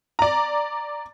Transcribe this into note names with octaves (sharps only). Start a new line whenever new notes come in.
D5 A#5